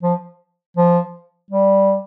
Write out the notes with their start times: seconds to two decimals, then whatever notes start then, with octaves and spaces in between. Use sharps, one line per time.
0.03 F3
0.77 F3
1.51 G3